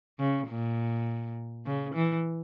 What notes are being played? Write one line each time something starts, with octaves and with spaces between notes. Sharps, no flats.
C#3
A#2
C#3
E3